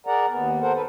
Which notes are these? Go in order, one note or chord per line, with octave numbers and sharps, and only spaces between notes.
G#4 A#4 D5 F#5 A#5
D#2 B3
G#2 A4 A#4 C5 F#5
A4 B4